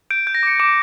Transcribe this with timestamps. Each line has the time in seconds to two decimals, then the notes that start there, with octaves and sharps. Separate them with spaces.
0.11 G6 D7
0.27 G6
0.35 A#6
0.43 D6 C#7
0.60 D6 D7